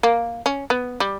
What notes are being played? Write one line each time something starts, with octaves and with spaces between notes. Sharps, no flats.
A#3
C#4
B3
G3